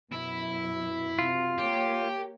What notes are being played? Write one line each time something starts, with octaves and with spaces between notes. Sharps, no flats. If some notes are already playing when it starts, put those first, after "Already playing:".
F#2 B2 E4
C3 F4 F#4
A#3 G4 C#5